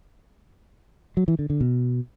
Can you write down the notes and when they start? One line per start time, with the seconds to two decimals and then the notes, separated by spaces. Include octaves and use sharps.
1.17 F#3
1.28 E3
1.39 D3
1.50 D3
1.61 B2